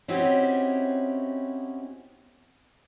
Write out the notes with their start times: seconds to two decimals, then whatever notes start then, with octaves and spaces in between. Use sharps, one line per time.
0.08 C4 C#4 D#4 E4 F#4 G4